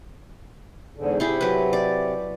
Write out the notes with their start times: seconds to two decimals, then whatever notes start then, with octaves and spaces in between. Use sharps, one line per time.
0.96 E2 G#2 D3
1.20 C3 E4 G4 G#4
1.41 F#3 B4
1.73 D5